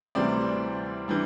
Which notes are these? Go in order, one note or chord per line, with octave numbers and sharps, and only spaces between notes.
D2 C3 E3 G3 C4 D5
E3 G3 D4